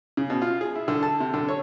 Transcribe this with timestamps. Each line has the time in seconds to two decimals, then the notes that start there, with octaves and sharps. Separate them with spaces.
0.17 C#3
0.30 B2
0.42 F4
0.61 G#4
0.75 E4
0.88 D3
1.03 A5
1.20 C3
1.34 D3
1.48 C#5